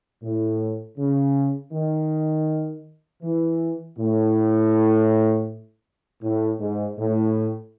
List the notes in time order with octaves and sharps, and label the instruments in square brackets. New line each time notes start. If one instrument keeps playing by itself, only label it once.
[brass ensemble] A2
C#3
D#3
E3
A2
A2
G#2
A2